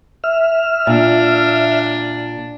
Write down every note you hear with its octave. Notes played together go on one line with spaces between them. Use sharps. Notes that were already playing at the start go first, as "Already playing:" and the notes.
E5 F6
A#2 D4